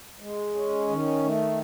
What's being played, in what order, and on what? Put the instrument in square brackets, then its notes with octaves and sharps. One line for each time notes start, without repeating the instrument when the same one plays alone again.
[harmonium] G#3
C#4
D#3
A3